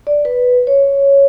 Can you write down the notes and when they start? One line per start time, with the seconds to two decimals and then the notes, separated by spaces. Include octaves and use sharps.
0.07 D5
0.25 B4
0.67 C#5